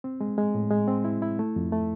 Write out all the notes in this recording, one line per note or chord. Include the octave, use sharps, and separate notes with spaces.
C4
G#3
G#3
A2
G#3
C4
E4
E4
A3
F2
A3